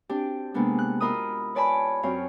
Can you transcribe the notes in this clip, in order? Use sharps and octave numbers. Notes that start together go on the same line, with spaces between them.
C4 D4 G4
C3 G#3 A#3 B3 D4
F#6
E4 F4 A#4 D#5 B5 D#6
B4 C#5 D5 G#5 A5 B5
F#2 C4 C#5 F5